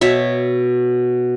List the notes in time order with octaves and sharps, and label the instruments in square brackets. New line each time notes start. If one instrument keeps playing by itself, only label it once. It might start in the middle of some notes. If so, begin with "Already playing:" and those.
[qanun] B2 C#5 E5